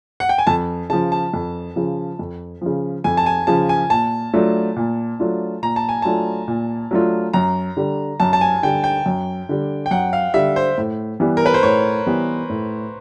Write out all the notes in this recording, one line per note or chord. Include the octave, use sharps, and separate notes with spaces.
F#5
G5
G#5
F2 A5
C#3 F3 A5
A5
F2
C#3 F3
F2
C#3 F3
F2 G#5
A5
G#5
C#3 F3 A5
G#5
A#2 A5
F#3 A3 D4 F4
A#2
F#3 A3 D4 F4
A#2 A#5
A5
G#5
F#3 A3 D4 F4 A5
A#2
F#3 A3 D4 F4
F#2 A#5
D3 G3
F#2 A5
A5
G#5
D3 G3 G5
G5
F#2
D3 G3
G5
F#2 F#5
F5
D3 G3 E5
C5
A2
E3 G3 B3
A#4
B4
C5
A2 C#5
E3 G3 B3
A2